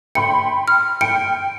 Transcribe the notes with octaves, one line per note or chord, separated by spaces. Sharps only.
G5 B5 C6 C#7
F6
G5 C#7 D7